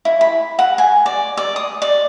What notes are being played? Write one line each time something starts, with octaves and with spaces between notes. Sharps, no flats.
E4
B5
F#5
G#5
D5
D5
D#6
D5